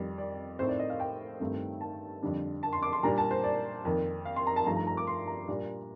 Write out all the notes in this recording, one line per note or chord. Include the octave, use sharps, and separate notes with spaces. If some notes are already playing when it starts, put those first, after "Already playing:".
Already playing: F2 D#3 G3
D5
A2 A3 C4 D#4 C5
D5
D#5
F5
G5
G2 D#3 A3 C4 D#4
A5
F2 D3 G3 D4
A5
C6
D6
C6
A#2 G3 D4 A#5
A5
C5
D5
F2 D#3 A#3
F5
C6
A#5
A5
G2 F3 A3 D#4 A#5
A#5
A#5
D6
C6
A#5
A#2 G3 D4